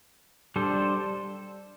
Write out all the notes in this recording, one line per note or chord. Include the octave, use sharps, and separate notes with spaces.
G3 D4 A4 C5